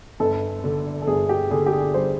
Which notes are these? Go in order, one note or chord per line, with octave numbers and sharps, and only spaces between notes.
G1 A4
D3
A4
G1 G#4
G4
D3 G#4
G4
G#4
G3 C5